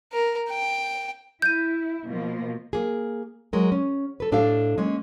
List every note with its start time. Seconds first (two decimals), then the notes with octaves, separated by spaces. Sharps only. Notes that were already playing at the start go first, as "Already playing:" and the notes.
0.13 A#4
0.50 G5
1.42 E4 G6 D#7
2.06 B2 F3 A#3
2.73 A#3 G#4
3.53 F#3 G#3 A#4
3.72 C#4
4.20 A4 B4
4.32 A2 D4 G4 A4 F5
4.78 G#3 A#3 C#4